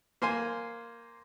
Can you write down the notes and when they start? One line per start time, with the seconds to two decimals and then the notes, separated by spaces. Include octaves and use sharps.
0.22 A#3 C5 G#5